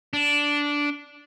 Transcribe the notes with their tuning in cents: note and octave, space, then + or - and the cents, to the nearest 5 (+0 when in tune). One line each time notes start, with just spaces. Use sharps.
D4 -10